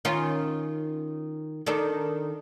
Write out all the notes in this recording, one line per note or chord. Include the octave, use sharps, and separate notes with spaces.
D#3 C#4 F4
D#3 D4 A4